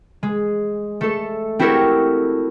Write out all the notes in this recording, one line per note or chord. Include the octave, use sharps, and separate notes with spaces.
G#3
A3 A4
C4 E4 F#4 G4 A4 A#4